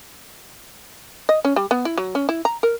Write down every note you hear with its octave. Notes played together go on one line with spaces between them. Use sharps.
D#5
C#4
G3
B3
E4
F#3
C#4
E4
A#5
A#4